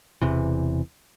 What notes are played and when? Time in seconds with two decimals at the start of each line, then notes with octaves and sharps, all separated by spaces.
0.22 E1 E2 C3 E3